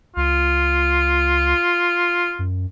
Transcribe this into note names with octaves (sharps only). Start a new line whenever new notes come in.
C#2 F4
F#2